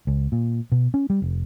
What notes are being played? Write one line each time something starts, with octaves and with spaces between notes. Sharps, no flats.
C#2
A#2
B2
C#4
G3
F1